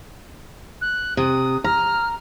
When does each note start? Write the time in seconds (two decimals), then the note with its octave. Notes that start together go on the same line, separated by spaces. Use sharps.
0.81 F#6
1.17 C3 D#6
1.64 A#5 F6